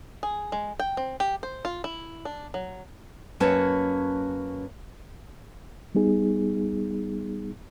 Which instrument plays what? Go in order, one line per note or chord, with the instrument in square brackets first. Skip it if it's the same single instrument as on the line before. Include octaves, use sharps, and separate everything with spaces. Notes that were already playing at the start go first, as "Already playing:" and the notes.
[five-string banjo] G#4
G#3
G5
C4
G4
C5
F4
E4
D4
F#3
[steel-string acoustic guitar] F#2 A#3 C#4 B4 C#5 A5
[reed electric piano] G3 B3 D#4 G#4